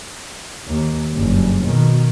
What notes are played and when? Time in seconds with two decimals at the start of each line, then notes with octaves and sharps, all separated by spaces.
0.68 D#2
1.12 F#1 G2
1.64 B2 D#3